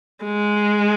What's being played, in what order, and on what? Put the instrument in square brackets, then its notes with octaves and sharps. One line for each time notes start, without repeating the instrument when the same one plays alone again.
[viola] G#3